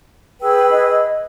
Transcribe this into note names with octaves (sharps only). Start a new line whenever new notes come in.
G#4 B4 G5 E6
D#5